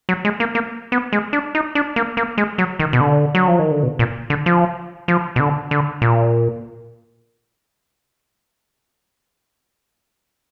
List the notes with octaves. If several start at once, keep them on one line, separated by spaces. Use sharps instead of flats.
F#3
G#3
A#3
A#3
B3
G#3
D4
D#4
D4
A#3
A#3
G#3
F#3
D#3
B2
D3
F#3
F3
D#3
D3
B2
A#2
D3
F3
F3
B2
D3
D3
A#2